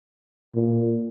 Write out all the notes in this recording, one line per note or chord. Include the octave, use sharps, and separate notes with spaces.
A#2